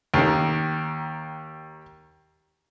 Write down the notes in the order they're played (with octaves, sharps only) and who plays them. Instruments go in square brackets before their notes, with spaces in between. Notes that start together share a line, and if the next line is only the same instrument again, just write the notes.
[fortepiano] D#2 D#3